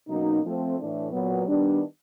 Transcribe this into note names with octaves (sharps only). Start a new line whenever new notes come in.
B2 F#3 A#3 C#4 D#4
F3 A3 C4
A2 E3 A3 D4
A#2 F#3 B3
D#3 G3 B3 D4